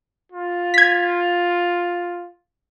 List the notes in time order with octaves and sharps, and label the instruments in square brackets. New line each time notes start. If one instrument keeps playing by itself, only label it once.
[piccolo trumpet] F4
[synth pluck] G#6 B6